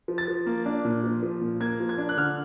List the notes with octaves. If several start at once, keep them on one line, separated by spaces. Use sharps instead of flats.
F3
A6
F3
A#3
D4
A#2
F3
F3
A#2
A#3 G#6
F3
G#6
D4
F#6
D3 F6